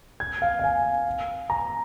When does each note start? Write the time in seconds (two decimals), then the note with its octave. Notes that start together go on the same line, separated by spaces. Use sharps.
0.20 G#6
0.42 F5
0.59 F5
0.64 G#5
1.50 A#5